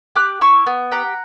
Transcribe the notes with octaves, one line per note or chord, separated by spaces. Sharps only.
G4 D6 F#6
E4 C#6 E6
B3
G4 F#5 A#5